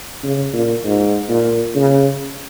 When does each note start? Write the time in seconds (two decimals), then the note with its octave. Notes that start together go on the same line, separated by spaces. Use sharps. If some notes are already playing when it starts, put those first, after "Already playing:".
0.24 C#3
0.53 A#2
0.84 G#2
1.29 A#2
1.75 C#3